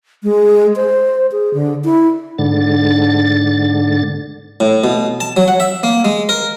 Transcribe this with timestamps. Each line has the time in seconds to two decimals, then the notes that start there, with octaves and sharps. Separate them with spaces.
0.23 G#3
0.76 C5
1.32 G#4
1.54 D3
1.85 E4
2.38 G#2 D3 A6
4.60 A2
4.84 B2
5.20 A5
5.37 F#3
5.48 F#5
5.60 E5
5.83 A#3
6.05 G#3
6.29 A#4